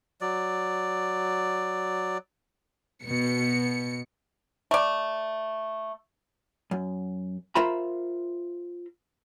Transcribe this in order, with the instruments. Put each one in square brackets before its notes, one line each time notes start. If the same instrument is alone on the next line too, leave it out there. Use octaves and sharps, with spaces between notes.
[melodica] F#3 D5
[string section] B2 C#7
[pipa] A3 D5
[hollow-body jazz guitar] F#2
F4 A#4 C5 E5 A#5 B5